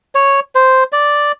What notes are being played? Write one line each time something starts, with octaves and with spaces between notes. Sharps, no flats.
C#5
C5
D5